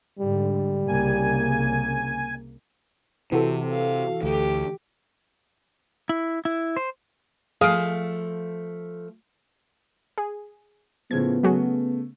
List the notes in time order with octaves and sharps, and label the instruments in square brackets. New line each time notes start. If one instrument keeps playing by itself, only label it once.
[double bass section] G#2 D3 [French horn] G3
[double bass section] C2 C#3 A#3 [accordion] G#5
[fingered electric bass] C3 [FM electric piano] E3 F#4 A4
[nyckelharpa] F5
[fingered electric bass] D2 [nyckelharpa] G4
[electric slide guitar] E4
E4
C5
[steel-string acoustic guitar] F3 A3 [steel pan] G#4 F5 D#6
[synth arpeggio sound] G#4
[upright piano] A2 C#3 F3 [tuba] B3 [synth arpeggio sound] G#6
[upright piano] C#3 A3 [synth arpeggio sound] F#3 F#4 G#4